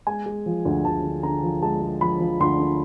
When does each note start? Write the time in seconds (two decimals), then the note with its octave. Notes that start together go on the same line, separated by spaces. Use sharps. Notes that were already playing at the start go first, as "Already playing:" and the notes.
0.07 G#3 G#5
0.26 G#3
0.46 F3
0.65 D2
0.85 D2 A5
1.04 D3
1.23 D3 A#5
1.43 F3
1.62 G#3 A5
1.82 G#3
2.01 F3 B5
2.20 F3
2.40 D2 C6
2.60 D3